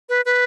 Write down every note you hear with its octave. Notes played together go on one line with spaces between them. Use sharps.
B4
B4